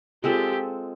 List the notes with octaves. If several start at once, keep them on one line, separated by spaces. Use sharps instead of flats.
G#3 C4 F4 G4 A4